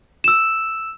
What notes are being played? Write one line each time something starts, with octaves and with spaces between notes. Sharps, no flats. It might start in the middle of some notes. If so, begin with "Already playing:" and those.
E6 E7